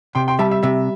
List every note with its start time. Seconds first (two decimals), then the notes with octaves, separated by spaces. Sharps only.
0.15 C3 G5 C6
0.28 G5 C6
0.39 G3 E5 A5
0.51 E5
0.63 C3 E5